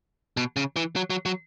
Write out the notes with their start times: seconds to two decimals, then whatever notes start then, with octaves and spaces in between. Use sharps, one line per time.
0.37 B2
0.56 C#3
0.76 E3
0.96 F#3
1.10 F#3
1.26 F#3